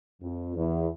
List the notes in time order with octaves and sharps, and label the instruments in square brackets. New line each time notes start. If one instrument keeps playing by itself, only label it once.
[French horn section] F2
E2